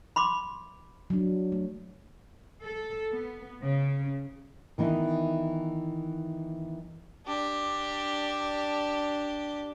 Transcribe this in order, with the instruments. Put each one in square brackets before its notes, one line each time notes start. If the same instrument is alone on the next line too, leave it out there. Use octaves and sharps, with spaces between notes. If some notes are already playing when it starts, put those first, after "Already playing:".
[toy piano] B5 C6 D6
[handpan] F#3 D4
A3
[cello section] A4
B3
C#3
[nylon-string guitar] D#3 E3 B3 D#4 E4
[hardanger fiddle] D4 G4